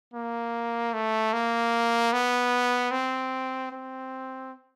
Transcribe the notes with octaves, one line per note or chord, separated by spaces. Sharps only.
A#3
A3
A#3
B3
C4
C4